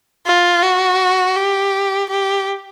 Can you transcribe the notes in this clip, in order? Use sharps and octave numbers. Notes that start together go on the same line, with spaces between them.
F4
F#4
G4
G4